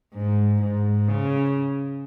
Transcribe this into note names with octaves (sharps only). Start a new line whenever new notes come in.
G#2
G#2
C#3